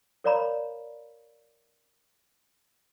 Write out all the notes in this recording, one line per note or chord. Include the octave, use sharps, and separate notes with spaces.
A#4 C#5 D5 F5 A#5 B5